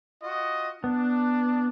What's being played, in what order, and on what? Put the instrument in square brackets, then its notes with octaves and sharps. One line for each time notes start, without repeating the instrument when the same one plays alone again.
[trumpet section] F4 F#4 D#5
[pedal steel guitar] B3 [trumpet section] D4